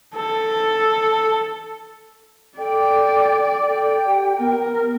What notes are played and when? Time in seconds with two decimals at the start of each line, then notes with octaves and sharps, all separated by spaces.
0.14 A4
2.58 A4 D5 G5
3.68 A4 G5
4.06 G4
4.39 B3 A#4